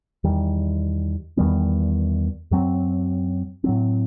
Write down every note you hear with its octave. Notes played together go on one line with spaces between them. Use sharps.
E2 D#3 G3
E2 D#3 G3 B3
F#2 F#3 C4
A2 F#3 C4